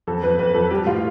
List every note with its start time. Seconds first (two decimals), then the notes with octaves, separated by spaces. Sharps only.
0.07 F2 A4
0.23 F2 B4
0.39 F2 B4
0.54 F2 A4
0.71 G3 G4
0.86 A2 F4